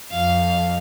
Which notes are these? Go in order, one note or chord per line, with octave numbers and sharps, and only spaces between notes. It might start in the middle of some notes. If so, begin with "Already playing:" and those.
F2 F5